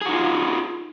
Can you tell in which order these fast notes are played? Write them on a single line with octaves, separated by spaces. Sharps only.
G#4 F#4 D#4 F4